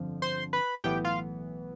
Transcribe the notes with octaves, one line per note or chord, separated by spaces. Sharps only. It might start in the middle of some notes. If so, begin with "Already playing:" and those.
Already playing: G1 F2 D3 F3
C5 C6
B4 B5
B1 A2 E3 B3 G4 G5
F4 F5